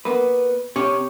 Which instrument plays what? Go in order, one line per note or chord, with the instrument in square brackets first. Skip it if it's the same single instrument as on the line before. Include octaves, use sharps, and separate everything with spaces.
[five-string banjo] A#3 B3 [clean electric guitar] B4
[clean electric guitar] C3 [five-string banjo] C#4 [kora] G4 C#5